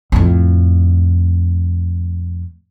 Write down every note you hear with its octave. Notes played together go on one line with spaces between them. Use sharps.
F2 A2